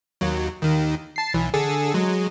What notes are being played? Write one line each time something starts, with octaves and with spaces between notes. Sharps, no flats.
D#2 F#3
D#2 D#3
A5 C7
B1 E3
D3 G#4 A4
F#3 G#3